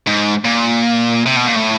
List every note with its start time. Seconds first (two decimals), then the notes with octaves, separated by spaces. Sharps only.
0.07 G#2
0.45 A#2
1.26 C3
1.37 B2
1.47 A#2
1.56 A2